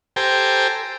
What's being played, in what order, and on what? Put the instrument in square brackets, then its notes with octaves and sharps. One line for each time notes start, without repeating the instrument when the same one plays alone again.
[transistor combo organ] G4 A4 C5 G5 G#5 A#5